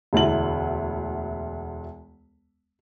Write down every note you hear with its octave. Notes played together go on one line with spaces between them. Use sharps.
E1 D2 E4 F#7